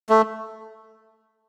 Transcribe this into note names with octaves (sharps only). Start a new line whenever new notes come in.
A3